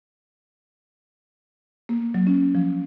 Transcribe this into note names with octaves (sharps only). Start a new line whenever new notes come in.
A#3
F#3
C#4
F3